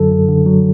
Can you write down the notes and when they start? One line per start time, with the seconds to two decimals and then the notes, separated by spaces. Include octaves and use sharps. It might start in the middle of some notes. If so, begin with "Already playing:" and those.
Already playing: F#2 D3 F#3 A4
0.11 F#2
0.29 D3
0.46 F#3